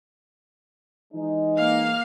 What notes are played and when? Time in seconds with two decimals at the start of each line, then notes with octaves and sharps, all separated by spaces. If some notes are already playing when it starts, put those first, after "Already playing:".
1.12 E3 G#3 D#4
1.57 A#3 F5